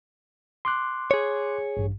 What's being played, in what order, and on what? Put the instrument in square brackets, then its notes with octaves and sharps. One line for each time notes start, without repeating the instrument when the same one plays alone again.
[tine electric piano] C6 D6 F#6
[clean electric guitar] G#4 C#5
[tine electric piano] A1 G2